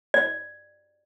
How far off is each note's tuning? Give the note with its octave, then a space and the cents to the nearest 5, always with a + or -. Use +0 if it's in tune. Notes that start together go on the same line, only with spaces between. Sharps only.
D5 +25